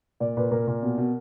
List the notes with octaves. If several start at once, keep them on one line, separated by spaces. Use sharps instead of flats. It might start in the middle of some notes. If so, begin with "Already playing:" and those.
A#2 D5
A#2 B4
A#2 A#4
A#2
B2
B2